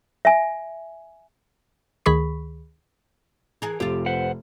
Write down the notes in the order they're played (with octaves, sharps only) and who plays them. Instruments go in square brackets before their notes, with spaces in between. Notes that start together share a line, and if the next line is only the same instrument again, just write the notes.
[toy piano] E5 G#5
[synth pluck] D2 D#3 G#4 B5 C#6 B6
[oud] E3 G#4 A#4
[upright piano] F1 [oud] C4 F4 [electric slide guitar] G4
[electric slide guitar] B4 C5 F#5